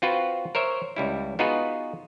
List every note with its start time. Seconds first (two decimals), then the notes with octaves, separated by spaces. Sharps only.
0.02 C4 F4 F#4 B4
0.55 A#4 C5 C#5 E5
0.96 C#2 G3 E4
1.39 B3 D#4 F4 F#4 G#4 B4